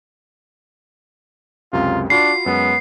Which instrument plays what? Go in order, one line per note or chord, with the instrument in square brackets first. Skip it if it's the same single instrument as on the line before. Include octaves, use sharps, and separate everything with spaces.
[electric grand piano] C#2 F#2 C3 [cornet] F4
[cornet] D4 [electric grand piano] F4 F#4 B5 [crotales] C7
[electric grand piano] F#2 G#3 [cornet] B3